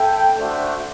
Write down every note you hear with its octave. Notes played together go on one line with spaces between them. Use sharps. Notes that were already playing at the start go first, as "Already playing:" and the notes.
Already playing: E4 A4 E5 G5
A3 D4 F#4 C5 E5